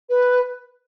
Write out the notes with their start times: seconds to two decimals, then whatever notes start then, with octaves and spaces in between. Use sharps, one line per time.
0.10 B4